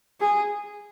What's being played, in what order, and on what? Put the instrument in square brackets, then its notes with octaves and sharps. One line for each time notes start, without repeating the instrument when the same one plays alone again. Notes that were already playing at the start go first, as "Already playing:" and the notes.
[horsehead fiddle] G#4